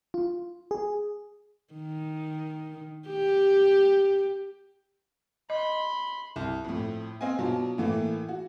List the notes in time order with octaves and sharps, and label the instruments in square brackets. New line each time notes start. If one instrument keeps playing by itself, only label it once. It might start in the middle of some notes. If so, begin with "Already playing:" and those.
[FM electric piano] F4
G#4
[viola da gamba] D#3
G4
[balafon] D#5 [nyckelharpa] B5 C6
[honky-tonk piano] C2
F2 A2
C4 D#5 F5 G#5
B2 F#3 D4 F4
A2 E3 A3 A#3
F#4